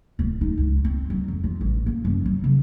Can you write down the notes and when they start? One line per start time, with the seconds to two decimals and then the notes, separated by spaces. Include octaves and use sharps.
0.19 D1
0.41 D#4
0.58 C#2
0.85 C4
1.10 F#3
1.28 F2
1.44 F4
1.61 A1
1.86 A#3
2.05 F#2
2.26 F#3
2.44 C#3